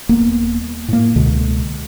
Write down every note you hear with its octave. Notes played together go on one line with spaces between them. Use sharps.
D#1 A#3 B3
A2 A#3
C#2 B2 D3